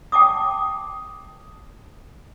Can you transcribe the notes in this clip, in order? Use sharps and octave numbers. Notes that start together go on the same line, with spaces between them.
G5 A5 D6 D#6